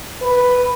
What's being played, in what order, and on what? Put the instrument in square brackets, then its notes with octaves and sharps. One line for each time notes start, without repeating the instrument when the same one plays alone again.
[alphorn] B4